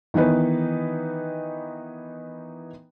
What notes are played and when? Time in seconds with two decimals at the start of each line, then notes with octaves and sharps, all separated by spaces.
0.14 D#3 E3 B3 D#4 B4